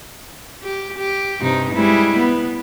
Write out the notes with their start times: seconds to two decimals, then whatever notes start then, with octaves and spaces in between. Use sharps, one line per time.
0.63 G4
0.98 G4
1.41 G2 C3 D#4
1.73 G3 G#3 E4
2.17 B3